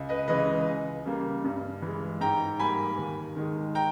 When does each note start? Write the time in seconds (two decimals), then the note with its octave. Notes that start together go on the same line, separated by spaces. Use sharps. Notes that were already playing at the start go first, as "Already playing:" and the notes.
Already playing: C#2
0.09 B4 D#5
0.28 C#3 E3 G#3 B4 D#5
0.67 C#2
1.05 C#3 G3 A#3
1.44 G2
1.82 E3 G#3
2.21 G#2 G5 A#5
2.59 G3 A#3 G#5 B5
2.98 D#2
3.36 D#3 G#3
3.75 G5 A#5